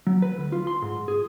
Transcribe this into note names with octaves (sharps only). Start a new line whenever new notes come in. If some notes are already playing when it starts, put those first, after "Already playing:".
F#3
B4
D2
F4
C6
G#2
G#4